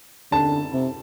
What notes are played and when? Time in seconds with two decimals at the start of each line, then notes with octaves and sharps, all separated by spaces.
0.32 D3 A5
0.73 C3